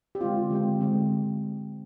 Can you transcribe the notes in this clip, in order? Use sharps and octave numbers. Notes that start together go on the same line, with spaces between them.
G4
D3 G#3 C4 F4
D3 G#3 C4
D3 G#3 C4